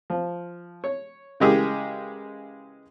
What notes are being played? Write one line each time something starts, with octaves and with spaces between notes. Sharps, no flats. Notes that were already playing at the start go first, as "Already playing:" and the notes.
F3
C#5
C#3 E3 G#3 G4 G#4 A#4